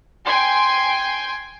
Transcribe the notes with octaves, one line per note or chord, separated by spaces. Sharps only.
G5 G#5 C6